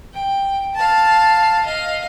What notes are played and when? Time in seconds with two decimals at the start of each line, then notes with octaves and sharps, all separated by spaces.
0.14 G5
0.75 F5 A5
1.65 D#5 F5